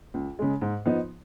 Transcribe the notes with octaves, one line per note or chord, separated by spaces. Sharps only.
C#2
C#3 G#3
G#2
F3 B3 D#4